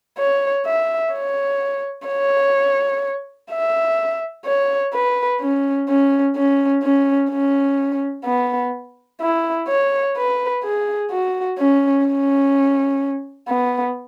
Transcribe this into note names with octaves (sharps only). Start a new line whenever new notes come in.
C#5
E5
C#5
C#5
E5
C#5
B4
C#4
C#4
C#4
C#4
C#4
B3
E4
C#5
B4
G#4
F#4
C#4
C#4
B3